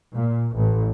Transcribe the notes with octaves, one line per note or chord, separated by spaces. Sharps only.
A#2
A1